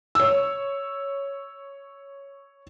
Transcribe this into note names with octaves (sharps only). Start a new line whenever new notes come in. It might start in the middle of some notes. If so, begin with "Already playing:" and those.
C#5 E6